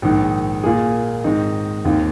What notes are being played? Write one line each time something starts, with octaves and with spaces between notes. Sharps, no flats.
A#1 G#2 D#3
A#2 A#3 G#4
G#2 D#3 C4 D#4
D#2 D#3 C4 F4